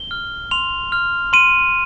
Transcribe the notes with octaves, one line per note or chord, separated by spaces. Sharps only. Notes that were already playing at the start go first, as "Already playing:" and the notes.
Already playing: G7
F6
C6 F7
F6
C6 D#7